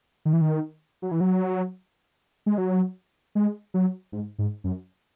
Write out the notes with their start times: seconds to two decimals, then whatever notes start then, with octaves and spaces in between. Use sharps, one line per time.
0.25 D#3
0.33 E3
0.41 D#3
1.02 F#3
1.11 E3
1.21 F#3
2.46 G#3
2.58 F#3
3.35 G#3
3.74 F#3
4.12 G#2
4.39 G#2
4.64 F#2